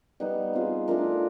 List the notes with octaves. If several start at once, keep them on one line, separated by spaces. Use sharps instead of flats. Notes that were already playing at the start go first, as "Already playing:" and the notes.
G3 B3 D#4
C4 F4 G#4
A3 D4 F4 A#4